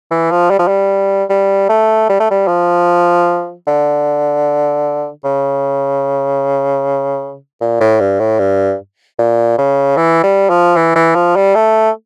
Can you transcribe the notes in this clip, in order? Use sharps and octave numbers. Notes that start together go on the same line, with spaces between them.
E3
F3
G3
F3
G3
G3
A3
G3
A3
G3
F3
D3
C#3
A#2
A2
G2
A2
G2
A#2
C#3
E3
G3
F3
E3
E3
F3
G3
A3